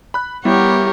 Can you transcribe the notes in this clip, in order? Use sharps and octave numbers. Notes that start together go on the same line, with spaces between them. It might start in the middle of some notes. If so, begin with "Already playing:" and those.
B5 F#6
G3 B3 E4 G4 A#4 C#5